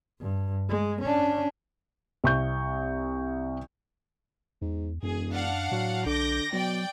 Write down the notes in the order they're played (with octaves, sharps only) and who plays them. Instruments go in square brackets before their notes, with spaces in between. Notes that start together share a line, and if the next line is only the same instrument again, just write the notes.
[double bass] G2
G#3
C#4 D4
[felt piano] C2 C#6 G6
[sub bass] E2 [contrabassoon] G#2
[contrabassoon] E1 [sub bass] F#2 [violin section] G#4
[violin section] D4 F5 F#5
[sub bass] A2 [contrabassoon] F#3
[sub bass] B1 [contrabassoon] D3 [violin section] D6 G6 A#6
[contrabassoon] B2 [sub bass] F#3 [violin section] D5 G5